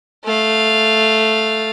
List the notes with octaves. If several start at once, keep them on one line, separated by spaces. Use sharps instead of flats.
A3 F5